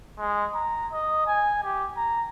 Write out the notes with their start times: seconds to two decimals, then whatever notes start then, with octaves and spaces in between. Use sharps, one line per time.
0.19 G#3
0.54 A#5
0.93 D#5
1.27 G#5
1.64 G4
1.97 A#5